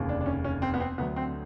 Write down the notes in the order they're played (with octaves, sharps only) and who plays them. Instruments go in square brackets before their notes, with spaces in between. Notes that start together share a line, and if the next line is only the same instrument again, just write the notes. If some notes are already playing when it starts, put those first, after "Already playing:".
Already playing: [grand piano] F1 D#2 C#3
D4
D4
C#4
C#4
C4
B3
C4
D2 D3 F#3 B3
C4